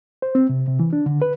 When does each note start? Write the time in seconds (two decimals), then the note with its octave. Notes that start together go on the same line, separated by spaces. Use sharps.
0.22 C5
0.35 C4
0.49 C3
0.67 C3
0.80 E3
0.93 D4
1.06 D3
1.22 B4